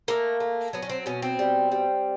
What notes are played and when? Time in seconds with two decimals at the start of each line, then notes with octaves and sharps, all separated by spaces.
0.08 A3 A#3
0.40 A3
0.73 F#3 B3
0.82 C#4
0.90 C4
1.06 B2 C#4
1.23 C4
1.39 G3
1.72 G3